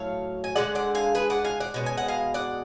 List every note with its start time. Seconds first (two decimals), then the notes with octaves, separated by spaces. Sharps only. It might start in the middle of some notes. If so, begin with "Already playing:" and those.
Already playing: A2 F#3 A3 C#5 F5
0.44 G#5
0.55 D3 G#3 C#4 D5 F#5
0.75 D5 F#5
0.95 F5 G#5
1.15 G#4 B4
1.30 D5 F#5
1.45 F5 G#5
1.60 D5 F#5
1.74 B2 G#3 C#4
1.86 G#5
1.98 F#5
2.08 F5 G#5
2.34 D5 F#5